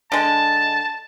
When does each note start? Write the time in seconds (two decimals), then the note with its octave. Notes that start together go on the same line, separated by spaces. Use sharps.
0.12 D3 G#3 A5